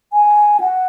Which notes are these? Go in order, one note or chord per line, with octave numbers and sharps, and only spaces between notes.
G#5
F#5